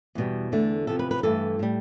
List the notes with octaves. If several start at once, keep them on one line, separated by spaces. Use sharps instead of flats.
E2 B2 G3
E2 D3 A3
E2 C3 F3 A4
B4
B4
G2 E3 A3 A4
A2 G3